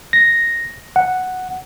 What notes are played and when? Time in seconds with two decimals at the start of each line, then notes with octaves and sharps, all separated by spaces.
0.13 A#6
0.96 F#5